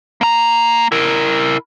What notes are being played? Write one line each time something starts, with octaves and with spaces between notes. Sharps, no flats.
A#3 A#5
E4 A#4